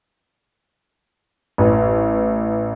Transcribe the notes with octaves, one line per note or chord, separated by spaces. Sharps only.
A1